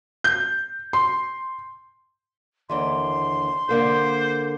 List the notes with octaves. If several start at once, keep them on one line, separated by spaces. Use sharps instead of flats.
G6
C6
D#2 D3 E3 C6
D3 A#3 A4 C5